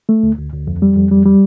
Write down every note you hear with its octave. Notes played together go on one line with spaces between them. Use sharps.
A3
D2
D2
D2
F2
G3
F2
G3
G3